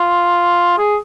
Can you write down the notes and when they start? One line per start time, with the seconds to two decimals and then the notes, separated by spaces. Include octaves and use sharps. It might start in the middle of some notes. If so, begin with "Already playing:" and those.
Already playing: F4
0.78 G#4